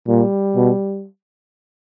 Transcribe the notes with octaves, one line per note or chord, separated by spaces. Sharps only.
A#2 G3
B2